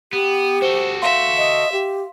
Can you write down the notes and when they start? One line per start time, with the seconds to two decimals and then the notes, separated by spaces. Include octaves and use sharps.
0.13 B3 G4
0.62 F#4 A4 C5 G7
1.02 E5 F5 C6
1.37 D#5
1.72 G4